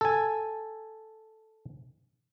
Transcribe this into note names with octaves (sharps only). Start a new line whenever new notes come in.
A4 G#5